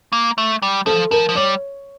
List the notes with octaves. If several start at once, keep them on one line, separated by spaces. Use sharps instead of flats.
A#3
A3
G3
F3 A4
F3 A#4
F3
G3 C#5